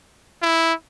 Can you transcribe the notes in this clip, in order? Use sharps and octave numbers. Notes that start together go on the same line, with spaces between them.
E4